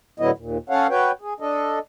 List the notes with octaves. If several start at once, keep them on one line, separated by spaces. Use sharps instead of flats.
A2 D3 F#3 B3 E4 D#5
D#2 A#2
C#4 A4 C#5 F5 F#5
F#4 B4 C#5 G5
G#4
D4 A4 D#5